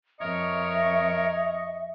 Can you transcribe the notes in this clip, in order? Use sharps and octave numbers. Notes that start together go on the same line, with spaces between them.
F2 A#4 C#5 D#5 E5 C#6